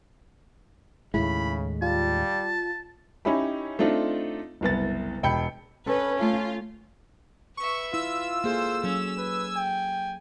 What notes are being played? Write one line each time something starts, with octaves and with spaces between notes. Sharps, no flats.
D#2 A2 C#3 G#3 E4 B5
G3 F4 A5
C#4 D#4 E4 G4 B5
A3 C4 D4 D#4 F4
F#1 C2 B3 A6
E1 G5 B5 G6 C#7
C#4 A4 B4
A3 F4
B4 E5 C#6
E4 F4 E6
A#3 G#4 A4 C5
F#3 C#4
B4 G#5
G5